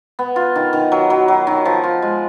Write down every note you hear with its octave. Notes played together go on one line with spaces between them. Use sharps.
B3
F4
D#3
D#3
F#3
F#3
F#3
D#3
F3
F4
G#3